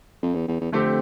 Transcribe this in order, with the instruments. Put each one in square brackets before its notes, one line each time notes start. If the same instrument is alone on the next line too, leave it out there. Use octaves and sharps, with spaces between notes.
[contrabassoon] F2
E2
E2
E2
[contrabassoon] F2 [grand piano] D3 A3 C4 G4